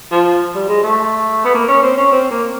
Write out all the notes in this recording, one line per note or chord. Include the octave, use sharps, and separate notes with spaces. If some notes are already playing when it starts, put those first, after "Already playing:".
F3
G3
G#3
A3
B3
A#3
C#4
C4
C#4
C4
A#3